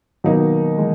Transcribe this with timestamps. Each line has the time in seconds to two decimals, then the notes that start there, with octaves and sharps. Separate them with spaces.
0.24 B2 D#3 F#3 A#3 D#4
0.78 E3 G#3